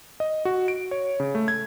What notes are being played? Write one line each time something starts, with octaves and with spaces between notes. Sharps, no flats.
D#5
F#4
D7
C#5
C#3
A3
G#6